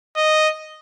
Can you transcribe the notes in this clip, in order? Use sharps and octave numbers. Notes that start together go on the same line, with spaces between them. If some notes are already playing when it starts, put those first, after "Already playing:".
D#5